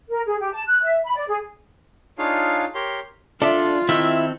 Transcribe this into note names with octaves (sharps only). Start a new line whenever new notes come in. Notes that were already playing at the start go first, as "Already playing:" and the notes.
A#4
G#4
G4
A5
F#6
E5
B5
D5
G#4
D4 D#4 F4 G#4 C#5 F5
G4 A#4 C#5 C6
D4 F4 A4 D5 E5
D#3 C4 E4 A4 E5